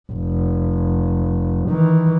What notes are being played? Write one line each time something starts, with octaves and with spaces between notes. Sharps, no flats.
F1
D#3 E3